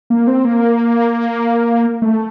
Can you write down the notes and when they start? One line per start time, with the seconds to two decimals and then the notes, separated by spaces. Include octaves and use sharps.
0.10 A#3
0.27 C4
0.45 A#3
2.02 A3